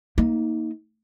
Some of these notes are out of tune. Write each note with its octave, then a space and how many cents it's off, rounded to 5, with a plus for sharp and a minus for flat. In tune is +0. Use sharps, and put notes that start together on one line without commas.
A#3 +0 D#4 +25